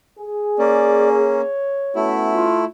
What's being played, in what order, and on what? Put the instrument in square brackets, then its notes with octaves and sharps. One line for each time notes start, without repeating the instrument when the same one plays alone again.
[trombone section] G#4
[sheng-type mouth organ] A#3 C#4 [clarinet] D5
[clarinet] C#5
[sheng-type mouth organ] A3 E4 [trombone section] B3 C#4 F#4
[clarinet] F4